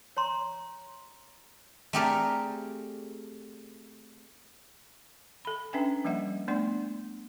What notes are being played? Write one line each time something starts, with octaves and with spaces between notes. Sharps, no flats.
C#5 A#5 C6
A3 C4 G4 G#4 A#4 D5
A4 B5
C#4 D4 B4 E5 G5 G#5
F3 G3 A#3 D#5 E5 F#5
A3 B3 D4 D5 F#5 C6